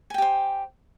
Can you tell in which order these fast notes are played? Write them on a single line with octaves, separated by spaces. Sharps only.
G#5 G5 G4 C5